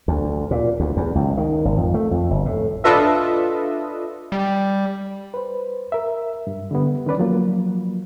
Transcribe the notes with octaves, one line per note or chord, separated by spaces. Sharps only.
D2
A#2
D2
E2
C#2
D#3
G#1
F2
A3
F2
G1
A2
D4 F4 A4 B4 D#5 E5
G3
B4 C5
A#4 E5
G2
D3 G3 B3
D#3 C#4 B4 D5
F3 F#3 A#3